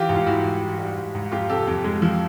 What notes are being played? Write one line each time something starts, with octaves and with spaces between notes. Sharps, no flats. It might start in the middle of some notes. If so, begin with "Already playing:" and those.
Already playing: E3 F4 G4
G#2
F4
E3 E4 F#4
G#2
E3
G3
G#2
G#2
F2 F4 G4
C3 G4 A4
F2
G#3
F3